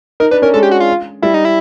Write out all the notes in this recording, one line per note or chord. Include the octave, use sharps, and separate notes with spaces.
D#4 A#4
D4 B4
C#4 A#4
G#3 A4
G4
F#4
F4
G3 E4
D#4
E4